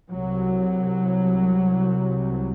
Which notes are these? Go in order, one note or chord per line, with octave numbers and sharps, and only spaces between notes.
C2 C3 F#3